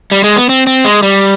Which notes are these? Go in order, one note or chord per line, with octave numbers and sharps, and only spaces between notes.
G3
G#3
B3
C4
C4
G#3
G3